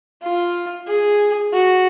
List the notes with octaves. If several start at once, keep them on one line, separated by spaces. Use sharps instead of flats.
F4
G#4
F#4